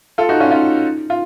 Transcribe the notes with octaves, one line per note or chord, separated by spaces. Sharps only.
F4 A4
D#4 F#4
C#4 F4
C#4 F4
F4